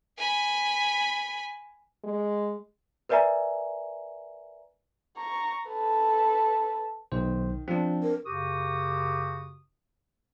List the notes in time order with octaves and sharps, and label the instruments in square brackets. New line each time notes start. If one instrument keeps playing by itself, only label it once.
[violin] G#5 B5
[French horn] G#3
[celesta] A#4 B4 D5 E5 G#5 A#5
[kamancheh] A#5 C#6
A4 B4
[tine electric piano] B1 C5 [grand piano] D#3
[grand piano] F3 [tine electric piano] C4 D4
[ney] A#4
[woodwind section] F#2 C#3 F#4 G4 D#6